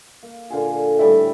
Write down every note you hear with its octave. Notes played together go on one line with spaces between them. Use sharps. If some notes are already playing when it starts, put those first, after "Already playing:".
A#3
A#2 D3 F4 G#4
A2 G3 E5 G5